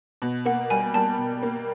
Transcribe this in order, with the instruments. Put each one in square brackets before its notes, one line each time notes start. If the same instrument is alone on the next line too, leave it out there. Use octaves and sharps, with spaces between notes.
[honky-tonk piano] B2
[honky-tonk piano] A#3 [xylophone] F#5
[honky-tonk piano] G3 [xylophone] G#5
[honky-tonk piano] G3 [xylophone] A5
[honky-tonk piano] B2
A#3